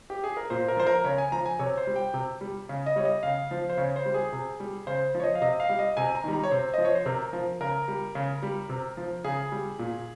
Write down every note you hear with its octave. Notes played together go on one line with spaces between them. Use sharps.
G4
G#4
A#4
A#2 C5
A#4
F3 C5
A#4
C#3 C#5
G#5
F3 A#5
G#5
C3 C#5
C5
G3
G5
C3
G3
C#3
D#5
G3 C#5
D#5
C#3 F5
F3
C5
C#3 C#5
C5
G3
G#4
C3
G3
C#3 C5
F3 C#5
D#5
F5
C3 D#5
F5
G3
D#5
C3 G#5
A#5
D#3 G3
A#5
C#5
C3 C5
F3 D#5
C#5
C5
C3 A#4
F3
C#3 A#4
G3
C#3
G3
C3
F3
C#3 G#4
G3
A#2